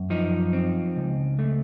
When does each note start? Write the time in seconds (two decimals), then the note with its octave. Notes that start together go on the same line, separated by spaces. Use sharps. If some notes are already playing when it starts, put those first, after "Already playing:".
Already playing: F#2
0.10 F3 D#4
0.53 C4
0.96 C#2
1.39 A3